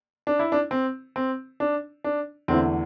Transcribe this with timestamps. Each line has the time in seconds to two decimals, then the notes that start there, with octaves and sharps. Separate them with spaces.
0.27 D4
0.39 E4
0.52 D4
0.71 C4
1.16 C4
1.60 D4
2.04 D4
2.48 E2 D3 A3 C4 E4